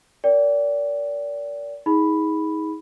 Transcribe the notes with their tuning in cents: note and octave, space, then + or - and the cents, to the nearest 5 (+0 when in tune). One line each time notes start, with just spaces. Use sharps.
A#4 +0 D5 -30 G5 +0
D#4 +35 G#4 +0 B5 +0